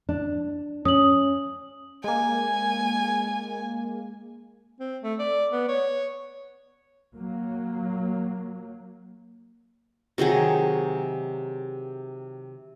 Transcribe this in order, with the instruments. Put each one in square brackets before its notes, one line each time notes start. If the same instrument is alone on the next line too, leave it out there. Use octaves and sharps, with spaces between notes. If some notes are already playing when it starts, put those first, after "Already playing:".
[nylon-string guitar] D4
[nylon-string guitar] C#4 [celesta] D#6 F#7
[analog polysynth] G#3 A#3 [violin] G#5
[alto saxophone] C4
A3
D5
B3
C#5
[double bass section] F#3 A#3
[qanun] C3 D#3 F#3 G#4